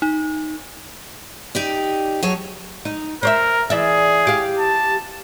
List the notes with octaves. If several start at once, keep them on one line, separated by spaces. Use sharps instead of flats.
D#4
D#4 G4 D5
F#3 G#4 C#5 A5
D#4
A#4 C5 C#5 E5
E3 G#4 D5 E5
G4 F5
A5